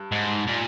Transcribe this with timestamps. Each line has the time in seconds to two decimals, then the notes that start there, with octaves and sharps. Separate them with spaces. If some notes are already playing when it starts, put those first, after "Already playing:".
Already playing: G2
0.12 G#2
0.47 A#2